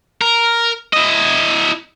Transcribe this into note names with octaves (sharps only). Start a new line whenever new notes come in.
A#4
E4 D#5